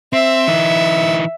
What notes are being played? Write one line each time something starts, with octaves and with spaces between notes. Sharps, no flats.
C4 E5
E3 D#4